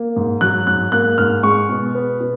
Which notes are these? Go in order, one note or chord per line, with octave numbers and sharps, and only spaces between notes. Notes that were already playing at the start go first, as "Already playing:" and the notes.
Already playing: A#3
G#2
F#3 F#6
G#2 F#6
A#3 F#6
G#2 F6
G#3 C#6
B2
B3
B2